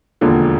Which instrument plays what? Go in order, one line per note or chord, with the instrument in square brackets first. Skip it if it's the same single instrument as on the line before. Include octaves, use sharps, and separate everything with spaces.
[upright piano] E1 D#2 D3 F3